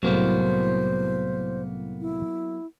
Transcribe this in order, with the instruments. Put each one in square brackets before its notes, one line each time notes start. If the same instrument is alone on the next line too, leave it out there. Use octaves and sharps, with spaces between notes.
[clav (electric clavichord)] C2 A2 [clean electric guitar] F#3 A#3 B3 [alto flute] C5
[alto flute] E4